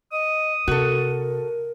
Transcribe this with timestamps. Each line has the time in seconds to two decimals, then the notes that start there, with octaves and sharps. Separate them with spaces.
0.12 D#5 D#6
0.68 C3 F#4 A4 A#4